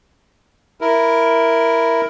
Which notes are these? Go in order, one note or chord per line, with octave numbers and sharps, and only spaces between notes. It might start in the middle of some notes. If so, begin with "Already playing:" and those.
E4 A#4